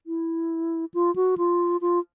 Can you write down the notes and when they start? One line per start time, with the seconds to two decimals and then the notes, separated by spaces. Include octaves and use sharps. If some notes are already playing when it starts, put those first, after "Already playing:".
0.07 E4
0.94 F4
1.16 F#4
1.38 F4
1.81 F4